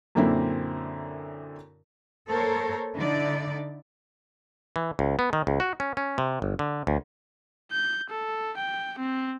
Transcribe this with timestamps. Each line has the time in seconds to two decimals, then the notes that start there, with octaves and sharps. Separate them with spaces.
0.15 F#2 A#2 D3 A#3 C4 E4
2.29 A#3 A4 A#4 C5 C#5
2.95 D3 D#4 E4 D5
4.76 E3
4.99 C#2
5.19 B3
5.33 D#3
5.47 C#2
5.60 F#4
5.80 C#4
5.97 C#4
6.18 C3
6.42 G1
6.59 D3
6.87 D2
7.72 G6
8.10 A4
8.57 G5
8.98 C4